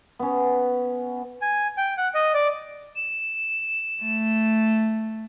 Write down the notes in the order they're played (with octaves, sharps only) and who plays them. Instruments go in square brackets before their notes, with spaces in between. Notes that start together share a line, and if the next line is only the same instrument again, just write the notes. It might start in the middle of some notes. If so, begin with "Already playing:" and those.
[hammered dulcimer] B3 C#4
[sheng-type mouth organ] G#5
G5
F#5
D#5
D5
[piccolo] E7
[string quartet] A3